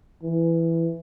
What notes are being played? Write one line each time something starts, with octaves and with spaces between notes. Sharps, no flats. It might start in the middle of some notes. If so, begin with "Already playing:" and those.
E3